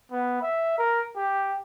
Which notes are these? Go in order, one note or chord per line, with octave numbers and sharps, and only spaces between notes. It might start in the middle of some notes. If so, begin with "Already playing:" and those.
B3
E5
A#4
G4